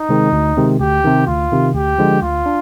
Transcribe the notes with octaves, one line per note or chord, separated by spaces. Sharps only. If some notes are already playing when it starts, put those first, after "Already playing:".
Already playing: D#4
C3 D#3 G#3 C4
D2
C3 D#3 G#3 C4
D2 G4
C3 D#3
D2 F4
C3 D#3
D2 G4
D3 F3 G#3 D4
D2 F4
D4